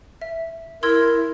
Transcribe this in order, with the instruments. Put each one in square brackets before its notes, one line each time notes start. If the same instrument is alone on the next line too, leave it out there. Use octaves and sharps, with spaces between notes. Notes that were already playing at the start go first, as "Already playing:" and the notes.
[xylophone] E5
[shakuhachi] E4 [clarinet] A#4 [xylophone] C6 E6 G#6